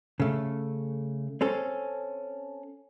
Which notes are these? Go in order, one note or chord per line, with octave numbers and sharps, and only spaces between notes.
C#3 A3
C4 C#4 A4